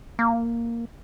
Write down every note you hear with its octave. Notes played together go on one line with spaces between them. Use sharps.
A#3